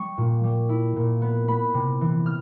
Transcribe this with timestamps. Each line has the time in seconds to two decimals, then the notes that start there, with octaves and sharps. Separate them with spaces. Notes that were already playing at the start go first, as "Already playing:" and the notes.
Already playing: G3 C#6
0.18 A#2
0.44 G3
0.69 E4
0.96 A#2
1.22 B3
1.48 B3 B5
1.74 C3
2.01 E3
2.26 F6